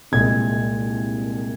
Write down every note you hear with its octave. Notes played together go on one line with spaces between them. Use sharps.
C2 A#2 G#3 G#6